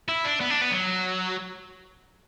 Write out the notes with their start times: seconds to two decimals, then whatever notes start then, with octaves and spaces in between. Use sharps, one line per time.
0.08 E4
0.25 D4
0.40 B3
0.50 D4
0.61 B3
0.71 F#3